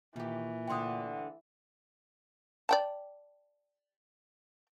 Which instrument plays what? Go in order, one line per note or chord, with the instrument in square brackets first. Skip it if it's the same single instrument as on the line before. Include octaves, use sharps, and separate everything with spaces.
[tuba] A#2 [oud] D#3 G4 [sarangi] E3
[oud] D2 D3 [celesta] G5 C6 D#6
[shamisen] D5 G5 A5